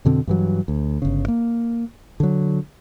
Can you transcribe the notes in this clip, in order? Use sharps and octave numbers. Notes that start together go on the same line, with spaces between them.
F2 B2 D3 C4
G2 E3 F#3
D2
G1 C#3
A#3
D3 F#3